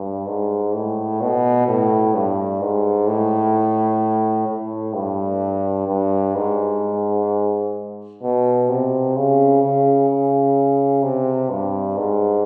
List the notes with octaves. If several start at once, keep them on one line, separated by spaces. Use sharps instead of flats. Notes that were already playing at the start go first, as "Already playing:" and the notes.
Already playing: G2
G#2
A2
B2
A2
G2
G#2
A2
A2
G2
G2
G#2
B2
C3
C#3
C#3
C#3
C3
G2
G#2